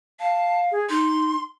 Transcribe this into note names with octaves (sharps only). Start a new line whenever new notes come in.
F5 A5
G#4
D#4 C6